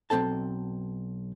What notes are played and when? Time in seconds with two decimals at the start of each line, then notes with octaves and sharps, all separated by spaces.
0.10 B1 E2 C4 A4 A5